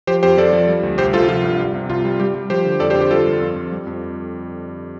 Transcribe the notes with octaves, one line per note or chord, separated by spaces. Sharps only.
F3 G4 C5
F2 G4 C5
F3 A4 D5
F3
G3
D2
C2 G4 C5
C2 F4 A4
F3 F4
G2
G3
C3
C2 F4
G3
G3 G4
G3
F3 G4 C5
D3
F2 A4 D5
G4 C5
D3
G4 C5
G3 F4 A4
G2
F2
F3
G3
F2